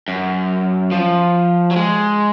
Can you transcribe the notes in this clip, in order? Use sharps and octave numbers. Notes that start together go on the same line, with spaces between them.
F#2
F3
F#3
G#3